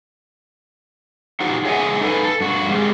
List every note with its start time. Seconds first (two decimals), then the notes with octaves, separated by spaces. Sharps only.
1.40 D#4 F#4 G4 C5
1.65 G#4 C#5 D#5 E5 F#5 G#5
2.01 D#4 A4 B4 G#5
2.24 A4
2.41 G2 F#4
2.69 G3 G#3 C4